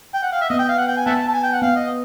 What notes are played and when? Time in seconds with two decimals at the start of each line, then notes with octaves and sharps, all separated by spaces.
0.14 G5
0.23 F#5
0.32 F5
0.41 E5
0.50 B3 D#5
0.59 G5
0.69 F5
0.78 F#5
0.87 G5
0.97 G#5
1.06 B3 E5 F#5 A5
1.29 A5
1.34 G#5
1.43 G5
1.53 F#5
1.62 B3 F5
1.76 D#5